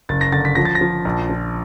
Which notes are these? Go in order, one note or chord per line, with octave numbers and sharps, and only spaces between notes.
F#1 A6
A#6
D3 A6
B6
F3 A#6
A6
A#6
F3
A#1
F3